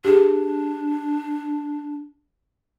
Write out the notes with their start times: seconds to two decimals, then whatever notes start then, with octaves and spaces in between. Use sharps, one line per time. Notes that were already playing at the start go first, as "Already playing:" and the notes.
0.05 D4 G4 G#4